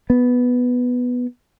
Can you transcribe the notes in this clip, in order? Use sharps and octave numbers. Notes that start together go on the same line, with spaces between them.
B3